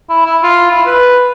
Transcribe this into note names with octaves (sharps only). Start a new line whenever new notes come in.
E4
E4
F4
E4
B4